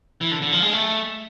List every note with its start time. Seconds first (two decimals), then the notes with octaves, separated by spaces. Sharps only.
0.21 E3
0.32 D3
0.42 D3
0.52 F3
0.62 G#3
0.73 A3